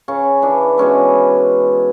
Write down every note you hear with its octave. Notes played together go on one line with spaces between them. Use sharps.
C#3 C#4
E3 D4 E4
B2 G#3 C#4 E4